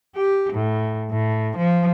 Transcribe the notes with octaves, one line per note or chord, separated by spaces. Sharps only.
G4
A2
A2
F3